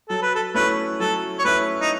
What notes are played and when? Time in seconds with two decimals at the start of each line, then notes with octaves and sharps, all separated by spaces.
0.09 F#3 A4
0.22 B4
0.35 A4
0.54 A3 C#4 E4 B4
1.00 F#3 A4
1.39 C#5
1.44 A3 C#4 E4 B4
1.81 D#4